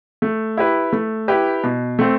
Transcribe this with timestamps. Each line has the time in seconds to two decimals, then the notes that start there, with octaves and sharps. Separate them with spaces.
0.22 A3
0.57 E4 G4 B4
0.93 A3
1.28 E4 G4 B4
1.63 B2
1.99 A3 C4